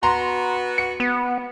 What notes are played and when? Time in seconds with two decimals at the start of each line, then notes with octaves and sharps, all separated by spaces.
0.03 B3 F#4 A#5 C6
0.78 C#7
1.00 B3